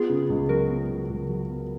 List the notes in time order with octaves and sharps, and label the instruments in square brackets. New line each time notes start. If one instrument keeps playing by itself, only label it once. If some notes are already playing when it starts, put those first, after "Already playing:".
Already playing: [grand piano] B3 [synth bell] F4 G#4
[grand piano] C#3
C#2
[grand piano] F#3 [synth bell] F#4 A#4
[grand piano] B3
C#3
C#2
F#3
B3